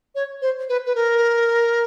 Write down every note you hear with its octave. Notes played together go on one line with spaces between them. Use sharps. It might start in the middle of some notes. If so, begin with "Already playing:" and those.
C#5
C5
B4
B4
A#4